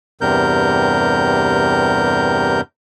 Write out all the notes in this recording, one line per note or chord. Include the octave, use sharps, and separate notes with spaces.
E2 G2 C3 A#4 G6